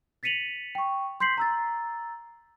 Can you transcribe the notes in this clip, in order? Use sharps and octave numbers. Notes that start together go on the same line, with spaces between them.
A6 B6 C#7 D#7 F7 F#7
G5 C#6
C6 G6 B6 C7 F#7
A#5 E6 A6